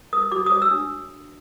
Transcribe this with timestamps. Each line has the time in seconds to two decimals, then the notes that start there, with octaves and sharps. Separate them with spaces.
0.13 A#4 D#6
0.32 F#4 D6
0.46 D#6
0.52 C#5
0.62 E6
0.71 D4